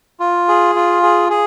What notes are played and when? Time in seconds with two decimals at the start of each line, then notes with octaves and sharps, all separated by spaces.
0.20 F4
0.48 G#4
0.75 F4
1.03 G#4
1.30 G#4